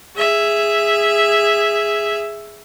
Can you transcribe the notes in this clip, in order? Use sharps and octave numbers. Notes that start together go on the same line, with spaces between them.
G#4 E5